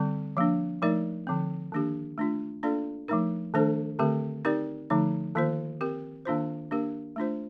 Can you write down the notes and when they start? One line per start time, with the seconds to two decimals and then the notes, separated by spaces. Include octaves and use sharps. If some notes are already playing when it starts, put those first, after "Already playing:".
Already playing: D3 G3 C4
0.37 F3 A#3 D4
0.82 F3 A3 D#4 A#4 D5
1.27 D3 F3 C4
1.72 D#3 A#3 D4 G4
2.18 A3 D4 F4
2.63 A#3 D4 F4 A4 D5
3.08 F3 A3 D#4 A#4
3.54 D#3 A3 D4 A4 C5
3.99 D3 A3 C4 G4 A#4
4.45 C4 D#4 G4 A#4 D5
4.90 D3 F3 A3 D#4
5.35 D#3 A#3 F4 C5
5.81 C4 G4 A#4
6.25 D#3 A#3 D4 F4 C5
6.71 A#3 D4 G4 A#4
7.16 A3 D4 F4 C5